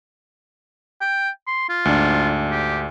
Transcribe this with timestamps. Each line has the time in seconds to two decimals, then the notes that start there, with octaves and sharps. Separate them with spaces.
1.01 G5
1.47 C6
1.69 F4
1.85 D2 G#2 D4
2.51 G4